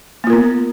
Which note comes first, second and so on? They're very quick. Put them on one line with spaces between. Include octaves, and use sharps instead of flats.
A#3 F4 A#4 B3